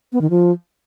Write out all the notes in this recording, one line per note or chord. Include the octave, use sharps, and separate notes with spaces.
B3
D#3
F3